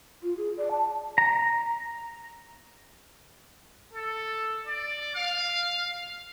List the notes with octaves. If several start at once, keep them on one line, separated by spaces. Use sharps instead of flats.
F4
G#4
D5
A5
A#5
A4
D5
F5